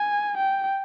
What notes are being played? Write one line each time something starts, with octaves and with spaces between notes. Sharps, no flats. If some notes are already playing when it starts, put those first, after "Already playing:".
Already playing: G#5
G5